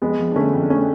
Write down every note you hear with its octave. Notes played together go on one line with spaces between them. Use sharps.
F2 G#3 B3
F3
D4
D3 A3 C#4
F2
D4
A3 C#4